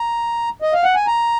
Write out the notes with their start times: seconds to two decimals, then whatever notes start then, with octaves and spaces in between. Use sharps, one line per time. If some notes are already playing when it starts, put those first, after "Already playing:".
Already playing: A#5
0.62 D#5
0.73 F5
0.84 F#5
0.95 G#5
1.07 A#5